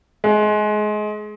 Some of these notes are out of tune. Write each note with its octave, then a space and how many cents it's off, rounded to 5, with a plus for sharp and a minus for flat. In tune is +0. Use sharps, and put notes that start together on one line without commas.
G#3 +25